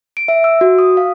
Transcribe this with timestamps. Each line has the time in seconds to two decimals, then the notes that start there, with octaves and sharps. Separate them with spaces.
0.17 D7
0.28 E5
0.44 E6
0.61 F#4
0.78 D#6
0.97 F5